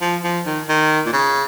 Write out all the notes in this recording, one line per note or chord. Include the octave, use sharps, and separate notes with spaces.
F3
F3
D#3
D#3
A#2
C#3